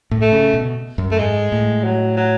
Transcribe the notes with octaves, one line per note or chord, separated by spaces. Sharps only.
A2
A3
C#3
B2
F#2
A3
G#2 G#3
A2
F#3
F#3